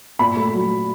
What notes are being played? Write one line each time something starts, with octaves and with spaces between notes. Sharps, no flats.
A#2 B5
A3
F#3